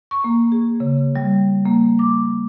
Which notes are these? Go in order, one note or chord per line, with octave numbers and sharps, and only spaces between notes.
C#6
A#3
G#4
C#3
G3
A#3
D6